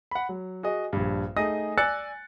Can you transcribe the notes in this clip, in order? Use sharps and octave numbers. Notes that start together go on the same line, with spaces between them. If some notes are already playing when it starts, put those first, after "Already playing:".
F#5 B5
F#3
F#4 G#4 D#5
A#1 G2
A3 D#4 G#4 D#5 D#6 A#6
D5 G#5 E6 F#6 A6 C#7